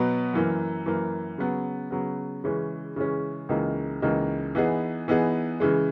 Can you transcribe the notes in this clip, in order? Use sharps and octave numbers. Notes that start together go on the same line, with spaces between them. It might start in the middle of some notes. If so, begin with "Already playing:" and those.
Already playing: B2 F#3 B3 F#4 B4
F#2 E3 A#3
F#2 E3 A#3
C#3 F#3 B3
C#3 F#3 B3
C#3 E3 G#3 C#4
C#3 E3 G#3 C#4
C#2 C#3 E3 A#3 D#4
C#2 C#3 E3 A#3 D#4
E3 B3 D#4 G#4
E3 B3 D#4 G#4
C#3 E3 G#3